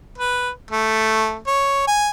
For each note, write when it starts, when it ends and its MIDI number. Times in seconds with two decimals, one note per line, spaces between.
0.18 0.50 71
0.71 1.38 57
1.47 1.82 73
1.87 2.10 80